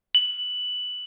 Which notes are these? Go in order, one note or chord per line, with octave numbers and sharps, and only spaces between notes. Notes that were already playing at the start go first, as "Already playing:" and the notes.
F#7